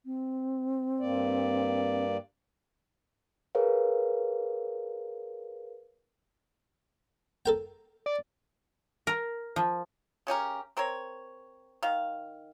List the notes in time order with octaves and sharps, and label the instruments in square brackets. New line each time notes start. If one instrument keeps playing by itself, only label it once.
[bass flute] C4
[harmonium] G2 A#3 D5
[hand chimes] G#4 A#4 B4 C#5 F5
[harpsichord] A4 A#4 G5
[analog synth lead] D5
[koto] A#4
F3
[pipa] C#3 C#4 G4 A#4
C4 A#4 C5 C#5
D#3 F5